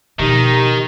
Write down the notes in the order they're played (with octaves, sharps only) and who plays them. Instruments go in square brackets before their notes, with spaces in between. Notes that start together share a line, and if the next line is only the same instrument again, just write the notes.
[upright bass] B2 F3 [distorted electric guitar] D#3 [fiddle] D#4 [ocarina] G4